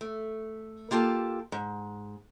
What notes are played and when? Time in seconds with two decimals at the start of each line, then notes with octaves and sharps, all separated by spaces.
0.01 A3
0.91 A#3 F4 G4 A4 A5
1.52 G#2